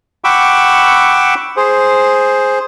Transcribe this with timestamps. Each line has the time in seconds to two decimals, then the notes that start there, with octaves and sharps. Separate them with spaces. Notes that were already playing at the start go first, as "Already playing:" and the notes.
0.24 F#5 G5 B5 C#6 D6 E6
1.57 G#4 C5